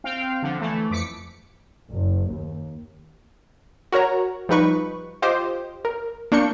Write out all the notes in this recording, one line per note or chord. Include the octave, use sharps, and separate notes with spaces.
C4 F5 G5
D3 F3
E3 A3
F2 D6 B6 C#7
F#1
D#2
F#4 A#4 C#5 A#5
F3 G3 D#4 B4 C#6
F4 G4 C5 D#5
A#4
A#3 D4 C#6 G6 C#7